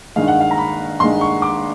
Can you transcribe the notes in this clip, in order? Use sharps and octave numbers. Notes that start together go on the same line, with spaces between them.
G2 D#3 G#3 F5
F#5
F5
A#5
B5
G2 D#3 G#3 C6
C#6
D6